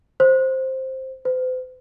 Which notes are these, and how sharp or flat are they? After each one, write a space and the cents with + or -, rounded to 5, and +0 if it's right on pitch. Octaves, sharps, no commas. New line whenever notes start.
C5 +10
C5 -40